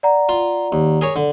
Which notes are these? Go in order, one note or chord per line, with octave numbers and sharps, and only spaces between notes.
D5 F#5 A#5
F4
D#2
G#4 A#4 C#5
D3